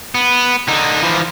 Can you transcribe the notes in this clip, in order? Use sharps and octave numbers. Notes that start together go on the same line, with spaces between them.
B3
D3 D#4
E3 F3